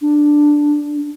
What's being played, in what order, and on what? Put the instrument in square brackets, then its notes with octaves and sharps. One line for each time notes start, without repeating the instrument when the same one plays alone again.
[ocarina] D4